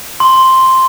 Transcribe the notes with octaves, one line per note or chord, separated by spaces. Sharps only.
C6